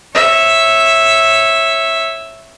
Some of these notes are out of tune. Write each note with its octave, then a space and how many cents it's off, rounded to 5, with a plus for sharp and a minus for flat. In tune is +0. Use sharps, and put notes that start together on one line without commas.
C#5 -20 E5 +0